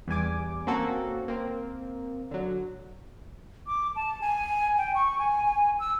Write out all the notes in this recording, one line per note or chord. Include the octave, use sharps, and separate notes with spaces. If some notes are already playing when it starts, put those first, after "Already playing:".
E2 G3 G#5 D6
A#3 C4 C#4 F#4 A4
A#3 C4
D3 F#3
D6
A5
G#5
G5
C#6
G#5
G#5
E6